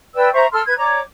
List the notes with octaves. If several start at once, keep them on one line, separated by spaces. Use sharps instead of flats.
B4 D5 G5 E6
C5 E5 A#5 C#6
A4 C6 E6 F6
B4 G#6
C#5 D5 A#5 D6